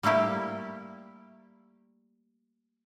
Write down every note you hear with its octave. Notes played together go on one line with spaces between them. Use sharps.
G3 A3 A#3 E4 G4